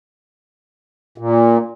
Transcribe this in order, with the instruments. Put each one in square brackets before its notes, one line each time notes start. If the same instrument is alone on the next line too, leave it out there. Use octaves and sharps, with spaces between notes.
[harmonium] A#2